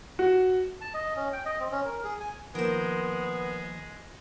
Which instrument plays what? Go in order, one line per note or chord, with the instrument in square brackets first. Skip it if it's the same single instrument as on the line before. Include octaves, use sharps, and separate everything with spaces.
[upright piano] F#4
[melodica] A5
D#5
C#4
G5
D#5
C4
C#4
A#4
G#4
G#5
[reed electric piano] D#3 F3 A#3 [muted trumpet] G#3 [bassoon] B3 [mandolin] A#4 C5